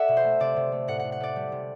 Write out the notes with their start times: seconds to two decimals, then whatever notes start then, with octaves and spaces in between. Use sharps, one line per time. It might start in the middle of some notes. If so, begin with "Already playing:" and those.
Already playing: A4 D5 E5 F#5
0.08 B2
0.17 C5
0.24 A3
0.40 C3 D5
0.56 C3
0.72 A3
0.88 A2 F#5
0.99 A2 F#5
1.12 F#5
1.20 A3 D5
1.36 G3
1.52 C3